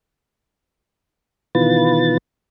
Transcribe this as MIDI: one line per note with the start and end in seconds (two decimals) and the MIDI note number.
1.55 2.17 47
1.55 2.17 51
1.55 2.17 52
1.55 2.17 65
1.55 2.17 71
1.55 2.17 93